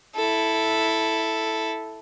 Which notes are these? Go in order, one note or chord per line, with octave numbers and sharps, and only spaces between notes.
E4 A4